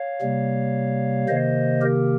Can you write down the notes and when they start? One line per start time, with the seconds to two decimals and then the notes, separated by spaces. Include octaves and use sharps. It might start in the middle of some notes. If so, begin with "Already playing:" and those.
Already playing: C#5 F5
0.21 C3 G3 A#3
1.28 C3 D#3 A#3 C5 D#5
1.81 G4 A#4